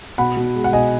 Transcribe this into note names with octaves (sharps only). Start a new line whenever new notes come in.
B2 F#5 B5
B2
G#3
F#5
B2 D#5 G#5